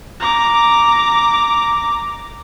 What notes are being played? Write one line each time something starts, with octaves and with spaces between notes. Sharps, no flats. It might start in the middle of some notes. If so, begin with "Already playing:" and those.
A#5 D6